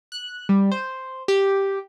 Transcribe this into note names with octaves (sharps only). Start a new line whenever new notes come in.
F#6
G3
C5
G4